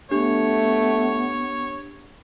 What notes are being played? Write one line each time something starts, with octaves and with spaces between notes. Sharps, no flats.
A3 B3 D4 G4 C#5